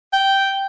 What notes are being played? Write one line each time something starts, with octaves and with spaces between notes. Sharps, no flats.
G5